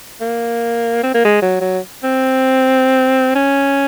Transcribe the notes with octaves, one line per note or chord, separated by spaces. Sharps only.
A#3
C4
A#3
G#3
F#3
F#3
C4
C#4